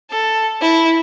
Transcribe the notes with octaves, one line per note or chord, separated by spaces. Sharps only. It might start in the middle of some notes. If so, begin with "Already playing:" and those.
A4
E4